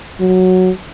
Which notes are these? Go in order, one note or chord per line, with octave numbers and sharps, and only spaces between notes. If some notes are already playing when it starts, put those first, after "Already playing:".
F#3